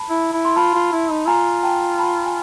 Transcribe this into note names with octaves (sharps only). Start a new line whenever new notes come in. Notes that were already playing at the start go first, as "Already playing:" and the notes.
Already playing: A5 B5
E4
E4
C6
F4 A5 B5
F4
E4
D#4
F4 G#5 A#5
G5 A5
A5 B5
G#5